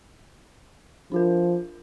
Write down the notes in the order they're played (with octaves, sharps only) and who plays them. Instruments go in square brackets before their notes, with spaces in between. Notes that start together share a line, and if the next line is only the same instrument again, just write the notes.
[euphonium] F3 [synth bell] D4 F4 A#4